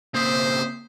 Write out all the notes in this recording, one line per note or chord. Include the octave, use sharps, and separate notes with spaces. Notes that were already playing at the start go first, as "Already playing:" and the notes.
C#3 A#3 C4 C5 D#6 B6